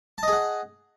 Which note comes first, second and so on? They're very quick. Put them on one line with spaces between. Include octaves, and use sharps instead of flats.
A5 D#5 G#4 F#5